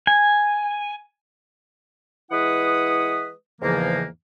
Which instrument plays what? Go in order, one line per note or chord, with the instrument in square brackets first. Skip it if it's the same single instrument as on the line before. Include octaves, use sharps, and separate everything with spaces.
[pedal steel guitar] G#5
[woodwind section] E3 G#3 E4 B4 F#5 D#6
E2 G#2 C#3 E3 F3 A#3